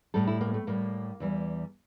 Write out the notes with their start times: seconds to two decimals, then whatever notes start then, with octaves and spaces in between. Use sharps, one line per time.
0.14 A2 G3 A4
0.27 E4
0.41 A#3
0.54 A3
0.67 A2 G3 A#3
1.20 E2 E3 G3